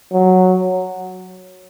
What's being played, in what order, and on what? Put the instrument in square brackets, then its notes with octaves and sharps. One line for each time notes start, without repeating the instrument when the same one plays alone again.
[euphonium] F#3